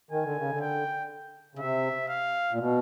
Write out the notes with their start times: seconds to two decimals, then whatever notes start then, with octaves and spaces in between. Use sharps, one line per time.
0.11 D#3 G#5
0.24 D3
0.37 C#3
0.51 D3
0.60 G5
1.55 C#3
1.59 C3 E5
2.08 F5
2.51 A#2
2.59 B2